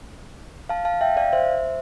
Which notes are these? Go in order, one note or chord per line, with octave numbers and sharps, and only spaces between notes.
F5 A5
F5 A5
E5 G5
D5 F5
C5 E5